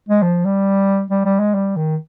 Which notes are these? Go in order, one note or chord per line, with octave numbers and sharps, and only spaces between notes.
G#3
F3
G3
G3
G3
G#3
G3
D#3